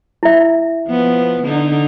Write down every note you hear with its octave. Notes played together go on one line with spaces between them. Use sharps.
E4 E5
F3 B3
D3 D#4